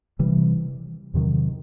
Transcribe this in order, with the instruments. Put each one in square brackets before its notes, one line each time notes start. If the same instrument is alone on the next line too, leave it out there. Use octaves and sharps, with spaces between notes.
[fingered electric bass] C3 E3 G3
E2 C3 D#3 F#3